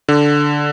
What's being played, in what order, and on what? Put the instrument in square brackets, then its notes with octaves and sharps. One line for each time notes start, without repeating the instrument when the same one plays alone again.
[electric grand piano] D3